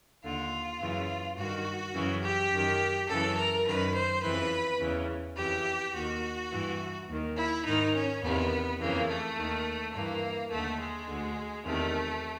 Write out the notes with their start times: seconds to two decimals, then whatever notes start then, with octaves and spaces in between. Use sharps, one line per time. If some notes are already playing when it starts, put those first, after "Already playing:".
0.23 D#2 D3 F4
0.81 F#2 C#3 E3
1.37 G2 D#3 F#4
1.94 F#2 C#3 E3
2.23 G4
2.52 F#2 D#3
3.09 F#2 C#3 E3 A4
3.38 A#4
3.66 F#2 D#3 B4
3.95 C5
4.23 F2 C#3 E3 B4
4.80 E2 C#3 E3
5.37 F2 C#3 E3 G4
5.94 D#2 D#3 F#4
6.52 G2 E3
7.08 D#2 D#3
7.37 E4
7.66 G#2 D#3 D#4
7.94 C#4
8.23 E2 C3 D#3 B3
8.80 F2 C#3 E3 A#3
9.09 A3
9.37 D#2 D#3
9.94 G2 E3 A#3
10.51 D#2 D3 A3
10.80 G#3
11.08 D2 D3
11.65 E2 C3 D#3 A3